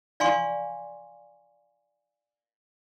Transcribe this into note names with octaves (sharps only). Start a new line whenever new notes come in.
D5 F5 G#5 C6 C#6